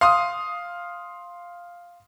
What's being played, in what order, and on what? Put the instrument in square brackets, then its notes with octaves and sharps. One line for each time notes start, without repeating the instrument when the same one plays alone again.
[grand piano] F5 C6 D#6